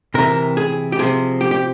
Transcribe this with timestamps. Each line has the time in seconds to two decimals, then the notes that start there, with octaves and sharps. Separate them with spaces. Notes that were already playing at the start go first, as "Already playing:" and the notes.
0.14 C3 E3 A#4
0.57 G#4
0.92 G4
0.99 C3 F3 G#4
1.41 G4
1.51 G4